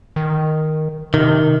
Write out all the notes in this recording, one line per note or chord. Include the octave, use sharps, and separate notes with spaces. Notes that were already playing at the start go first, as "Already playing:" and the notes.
D#3
C3 D#3